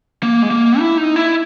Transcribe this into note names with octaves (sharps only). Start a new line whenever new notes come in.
A#3
G#3
A#3
E4
D#4
E4